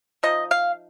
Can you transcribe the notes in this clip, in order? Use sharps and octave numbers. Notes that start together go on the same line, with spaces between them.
F3 D#4 D#5
F5